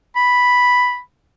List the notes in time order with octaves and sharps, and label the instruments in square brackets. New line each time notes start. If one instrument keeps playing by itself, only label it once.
[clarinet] B5